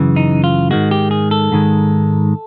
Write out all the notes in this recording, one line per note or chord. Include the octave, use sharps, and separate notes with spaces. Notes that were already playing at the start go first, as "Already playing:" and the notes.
Already playing: F#2 C#3 E3
D#4
F4
G#2 D#3 G#3 F#4
G4
G#4
A4
G#2 D#3 G#3